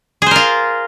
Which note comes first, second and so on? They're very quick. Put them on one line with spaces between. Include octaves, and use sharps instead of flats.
G#4 C5 A#4 F4